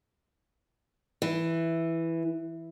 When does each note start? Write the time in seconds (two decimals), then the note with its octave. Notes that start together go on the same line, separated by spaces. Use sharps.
1.22 E3